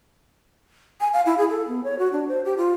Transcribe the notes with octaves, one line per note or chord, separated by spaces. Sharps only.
G#5
F5
E4
G#4
A4
B3
C#5
F#4
D4
C5
G4
F4